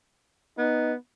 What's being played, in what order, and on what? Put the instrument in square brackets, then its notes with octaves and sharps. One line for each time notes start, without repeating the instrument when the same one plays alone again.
[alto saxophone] B3 [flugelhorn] D#4